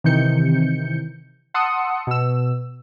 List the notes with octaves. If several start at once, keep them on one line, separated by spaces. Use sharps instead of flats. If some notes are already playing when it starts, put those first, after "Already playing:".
C3 D#3 E3 G6 C#7
F#5 A5 C6 D#6 E6 C#7
B2 E6